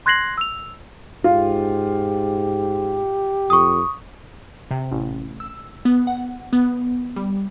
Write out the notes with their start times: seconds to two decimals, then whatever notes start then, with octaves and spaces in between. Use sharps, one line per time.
0.06 C6 F#6 G#6 A#6 C7 F#7
0.38 E6 F7
1.24 G#2 F4 G4
3.50 F2 C#6 D#6
4.71 C3
4.92 A1
5.40 E6
5.85 B3
6.07 F#5
6.53 B3
7.16 G3